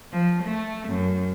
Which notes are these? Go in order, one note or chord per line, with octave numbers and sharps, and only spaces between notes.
F3
A3
F#2